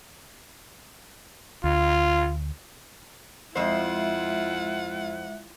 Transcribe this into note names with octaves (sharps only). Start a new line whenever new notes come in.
D2 F4
F2 G#3 E4 F4 C5 E5 F#5